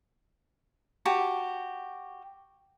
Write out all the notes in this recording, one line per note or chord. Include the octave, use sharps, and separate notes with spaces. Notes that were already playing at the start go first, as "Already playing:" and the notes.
F#4 G4 A5